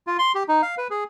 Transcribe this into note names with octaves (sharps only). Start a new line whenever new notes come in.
F4
C6
G4
D#4
F5
B4
G#4